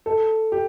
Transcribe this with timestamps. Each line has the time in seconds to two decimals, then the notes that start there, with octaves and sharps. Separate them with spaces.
0.06 A4
0.52 G4